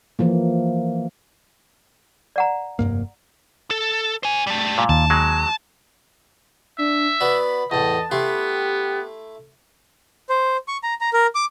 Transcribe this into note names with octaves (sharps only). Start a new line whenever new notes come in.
E3 F3 A#3
D5 F#5 A#5
F1 G2 A#3
A4
C5 G#5
G3 A3
A#2
D#2 A5
F#3 G#3
D4 E5
B3 F#4 D5 B5
E2 A2 D#5 A5
A3 B3 E4 G4 C6
C5
C#6
A#5
A#5
A#4
D6